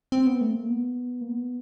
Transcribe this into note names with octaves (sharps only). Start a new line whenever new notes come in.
C4
B3
A3
A#3
B3
A#3
B3